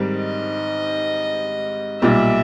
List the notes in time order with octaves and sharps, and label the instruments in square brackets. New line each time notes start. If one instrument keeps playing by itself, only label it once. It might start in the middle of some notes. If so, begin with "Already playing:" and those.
Already playing: [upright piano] G#2 D#3 G3 C4
[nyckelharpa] D#5
[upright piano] B1 A#2 G3 [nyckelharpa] E5